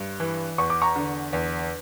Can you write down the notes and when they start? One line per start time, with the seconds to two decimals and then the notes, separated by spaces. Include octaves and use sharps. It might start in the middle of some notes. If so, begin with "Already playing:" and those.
Already playing: G2
0.20 E3
0.58 E2 C#6
0.70 D6
0.82 A#5 C#6
0.96 D3
1.33 E2